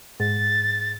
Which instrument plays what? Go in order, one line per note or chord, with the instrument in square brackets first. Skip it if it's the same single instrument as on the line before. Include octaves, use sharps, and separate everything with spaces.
[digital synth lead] G#2 [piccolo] A6